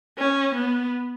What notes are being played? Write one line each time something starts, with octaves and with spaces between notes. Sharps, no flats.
C#4
B3